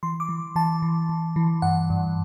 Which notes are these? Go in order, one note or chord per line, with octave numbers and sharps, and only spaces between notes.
E3 C6
D6
E3
E3 A5
E3
E3
E3
G2 F#5
G2